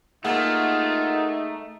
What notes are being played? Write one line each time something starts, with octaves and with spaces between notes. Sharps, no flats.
A3 A#3 D#4 F4 G#4 F#5